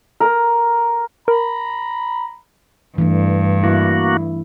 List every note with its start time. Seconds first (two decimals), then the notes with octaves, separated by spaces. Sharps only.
0.20 A#4
1.28 A#4 A#5 B5
2.98 G2 E3 A3 D4
3.64 A#3 E4 F#4